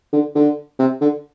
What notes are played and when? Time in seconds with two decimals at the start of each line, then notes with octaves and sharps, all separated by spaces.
0.13 D3
0.35 D3
0.79 C3
1.01 D3